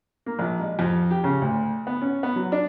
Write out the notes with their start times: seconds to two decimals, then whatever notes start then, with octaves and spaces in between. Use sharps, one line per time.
0.26 A#3
0.39 A#1
0.59 G#3
0.79 F2
1.11 G4
1.24 C#3
1.42 D2
1.87 B3
2.01 C#4
2.23 B3
2.36 F#3
2.52 D4